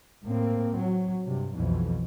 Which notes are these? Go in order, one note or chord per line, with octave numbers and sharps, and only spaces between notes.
A2 A#3 C4
F#3
G2 C3
B1 F2 B2 E3